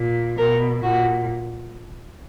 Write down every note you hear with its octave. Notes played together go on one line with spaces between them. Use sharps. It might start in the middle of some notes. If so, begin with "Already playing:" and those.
Already playing: A#2
B2 A#4
A#2 F#4